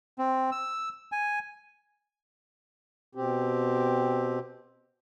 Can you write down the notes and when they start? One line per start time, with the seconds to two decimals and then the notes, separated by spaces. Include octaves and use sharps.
0.18 C4
0.52 E6
1.12 G#5
3.15 B2 C4 G4